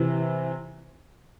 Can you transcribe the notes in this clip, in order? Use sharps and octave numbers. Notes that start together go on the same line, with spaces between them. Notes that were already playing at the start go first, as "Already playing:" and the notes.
Already playing: C3 E3